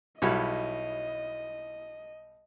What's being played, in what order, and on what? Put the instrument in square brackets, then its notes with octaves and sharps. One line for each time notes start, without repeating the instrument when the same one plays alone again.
[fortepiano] B1 G3 [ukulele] E4 F#4 C#5 [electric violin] D#5